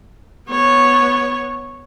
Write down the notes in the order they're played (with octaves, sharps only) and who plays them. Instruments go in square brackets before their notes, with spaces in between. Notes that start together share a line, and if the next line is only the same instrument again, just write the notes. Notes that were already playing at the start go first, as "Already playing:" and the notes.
[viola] B3 C#5